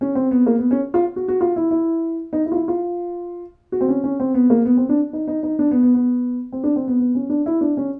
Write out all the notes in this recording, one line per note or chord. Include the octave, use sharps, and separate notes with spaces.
C#4
C4
B3
A#3
B3
C#4
F4
F#4
F#4
F4
E4
E4
D#4
E4
F4
E4
F4
F#4
C4
C#4
C#4
C4
B3
A#3
B3
C4
D4
D#4
D#4
D#4
D4
B3
B3
B3
C4
D4
C4
B3
B3
C#4
D4
E4
D4
C#4